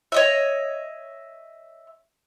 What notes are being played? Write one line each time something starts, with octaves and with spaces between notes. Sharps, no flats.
C#5 D#5 E5